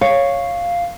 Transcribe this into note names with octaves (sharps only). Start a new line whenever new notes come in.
C#5 F5